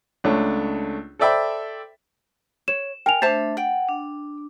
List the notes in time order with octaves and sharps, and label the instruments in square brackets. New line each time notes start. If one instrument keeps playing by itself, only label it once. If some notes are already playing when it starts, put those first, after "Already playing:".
[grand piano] C#2 A3 D4 C#5
A4 C5 D5 E5 G5 B5
[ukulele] C#5 [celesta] E7
[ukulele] A#4 [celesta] G5 G#5 F7
[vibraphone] A3 D4 [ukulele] C5 E5 A5 [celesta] A6
[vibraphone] F#5 [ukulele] G5
[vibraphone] D4